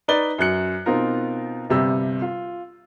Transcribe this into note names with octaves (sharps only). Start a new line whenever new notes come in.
D#4 B4 D5 G7
F#2 F#3 F#6 C#7
B2 C4 D#4 F4 A#4
G1 C3 G3 E6
F4